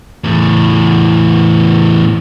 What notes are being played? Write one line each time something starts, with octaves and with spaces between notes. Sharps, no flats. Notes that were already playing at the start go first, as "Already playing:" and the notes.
E2 A2